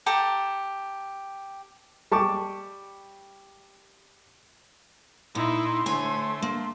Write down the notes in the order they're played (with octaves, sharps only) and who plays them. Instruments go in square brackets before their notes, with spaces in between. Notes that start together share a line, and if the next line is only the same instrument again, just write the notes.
[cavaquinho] G4 A4 A#5
[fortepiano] G3 A5 C#6 D6
[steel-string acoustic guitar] A#2 [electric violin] D#4 E4 [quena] C6
[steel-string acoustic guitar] D2 C#5 G#5 [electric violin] A3
[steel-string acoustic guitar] A#3